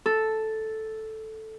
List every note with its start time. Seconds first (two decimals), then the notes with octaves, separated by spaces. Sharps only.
0.06 A4